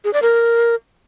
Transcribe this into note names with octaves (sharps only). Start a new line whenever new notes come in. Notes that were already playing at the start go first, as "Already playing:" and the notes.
G#4
D5
A#4